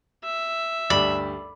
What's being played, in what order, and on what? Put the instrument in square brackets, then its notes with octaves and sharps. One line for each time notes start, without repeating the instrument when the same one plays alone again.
[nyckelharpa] E5
[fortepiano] D2 G2 G3 [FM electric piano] D5 [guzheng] B5